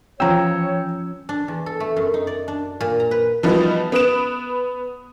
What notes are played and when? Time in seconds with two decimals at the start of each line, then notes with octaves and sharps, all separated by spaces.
0.20 E3 F3 C#4 C#5 G5 A#5 E6
1.29 D4
1.48 E2
1.66 A4
1.80 A3
1.96 F#2
2.14 D#4
2.27 D5
2.48 D4
2.80 A#2
3.00 A#5
3.11 B4
3.43 E3 F3 G3 B3 D#4 F#4
3.92 B3 B4 D#6 F#6 D7 E7